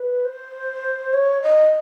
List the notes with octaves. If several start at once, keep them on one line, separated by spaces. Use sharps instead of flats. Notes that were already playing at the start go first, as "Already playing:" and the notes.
Already playing: B4
C5
C#5
D#5